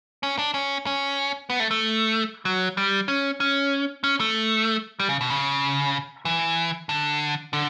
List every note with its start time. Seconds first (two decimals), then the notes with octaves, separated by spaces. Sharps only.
0.23 C#4
0.38 D4
0.54 C#4
0.86 C#4
1.50 B3
1.60 A3
1.71 A3
2.45 F#3
2.77 G3
3.08 C#4
3.40 C#4
4.04 C#4
4.20 A3
5.00 G3
5.09 C#3
5.21 B2
5.30 C#3
6.25 E3
6.89 D3
7.53 D3